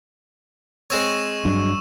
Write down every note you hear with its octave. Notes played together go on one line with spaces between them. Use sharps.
G#3 C4 C#5 C#6 E6 E7
G2 F#3 D4